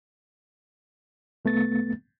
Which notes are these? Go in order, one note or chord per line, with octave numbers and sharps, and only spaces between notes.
C2 A3 B3 A6